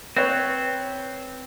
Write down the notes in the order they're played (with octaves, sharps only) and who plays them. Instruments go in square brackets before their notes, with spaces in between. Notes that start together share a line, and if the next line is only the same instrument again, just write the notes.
[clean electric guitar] C4 [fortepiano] B4 C#5